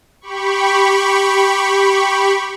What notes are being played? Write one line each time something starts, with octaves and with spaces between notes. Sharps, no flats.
G4 B5 C#6